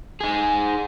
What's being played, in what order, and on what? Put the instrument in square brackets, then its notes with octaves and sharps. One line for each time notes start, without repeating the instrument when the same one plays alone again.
[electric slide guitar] D#4 G#4